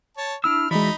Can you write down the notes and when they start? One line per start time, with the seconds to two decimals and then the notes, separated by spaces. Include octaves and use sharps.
0.17 C#5 A5
0.44 D4 E4 E6 F6
0.71 E3 G#3 D#4 F#4 D5 E5 B5